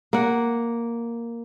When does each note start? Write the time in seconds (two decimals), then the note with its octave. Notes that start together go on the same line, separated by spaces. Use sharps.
0.13 A#3 F#5